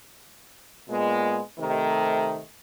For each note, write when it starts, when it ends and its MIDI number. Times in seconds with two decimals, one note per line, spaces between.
0.88 1.39 46
0.88 1.39 56
0.88 1.39 59
1.59 2.40 48
1.59 2.40 51
1.59 2.40 57